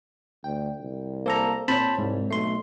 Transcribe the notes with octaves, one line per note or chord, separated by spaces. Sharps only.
D2 G5
C2
A#3 A4 C5 A#5
A#2 C4 C5 C#5 A5 B5
C2 G#2
B1 A3 C6 C7